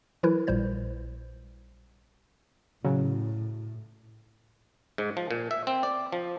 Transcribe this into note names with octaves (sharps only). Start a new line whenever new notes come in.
E3 F#3 E4 A#4 B4
A#1 A#2 G3 C5 G6
A2 C#3 F#3
G#2
F3
A#2
E5
C4
D5
F3